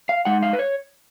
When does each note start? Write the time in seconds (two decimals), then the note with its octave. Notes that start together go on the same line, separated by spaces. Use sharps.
0.09 F5
0.25 G#3 D#4 F#5
0.43 F5
0.53 B4
0.59 C#5